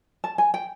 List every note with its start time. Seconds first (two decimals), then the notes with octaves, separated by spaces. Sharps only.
0.24 A5
0.38 G#5
0.54 G5